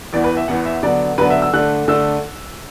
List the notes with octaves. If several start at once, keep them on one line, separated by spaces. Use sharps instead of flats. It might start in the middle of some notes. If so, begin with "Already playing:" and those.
E2 E3 B3 D5
B4
E5
E2 E3 B3 F#5
E5
D3 F#3 B3 D4 D5
D3 F#3 B3 D4 B4
E5
E6
D3 A3 D4 F#6
D3 A3 D4 E6